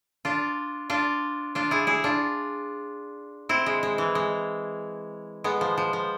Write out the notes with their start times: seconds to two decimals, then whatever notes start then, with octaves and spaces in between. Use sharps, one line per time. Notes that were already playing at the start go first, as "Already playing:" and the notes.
0.25 D4 F4
0.90 D4 F4
1.55 D4 F4
1.71 E4 G#4
1.87 E4 G#4
2.04 D4 F4
3.49 C4 E4
3.66 G#3
3.83 G#3
3.98 E3
4.15 G#3
5.44 G#3 B3
5.61 F3
5.78 F3
5.93 F3